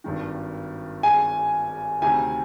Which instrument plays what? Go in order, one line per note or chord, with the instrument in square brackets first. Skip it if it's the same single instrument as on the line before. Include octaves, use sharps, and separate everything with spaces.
[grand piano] G#1 G2 D#3
[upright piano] G#5
[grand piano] D2 C3 D#3 [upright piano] G#5